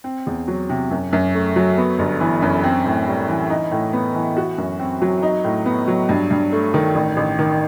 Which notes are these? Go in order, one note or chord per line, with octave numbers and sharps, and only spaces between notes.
C4
E2
F#3
C3
F#2
F#2
A3
F#3
B3
G1
E3
F#2
C4
A2
G3
E3
D#4
A2
B3
E3
F#4
F#2
C4
F#3
D#4
A2
B3
F#3
G2
G2
A3
D#3
A1
A1
D#3